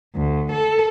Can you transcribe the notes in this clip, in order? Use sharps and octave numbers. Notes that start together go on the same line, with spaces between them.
D2
A4